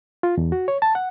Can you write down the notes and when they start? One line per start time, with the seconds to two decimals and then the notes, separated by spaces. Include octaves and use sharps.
0.23 F4
0.38 E2
0.52 F#4
0.68 C#5
0.82 A5
0.95 F#5